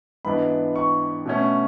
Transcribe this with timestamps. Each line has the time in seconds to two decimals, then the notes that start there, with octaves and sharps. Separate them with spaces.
0.25 G#2 E3 B3 D4 B5
0.76 C#6
1.25 B2 A3 C#4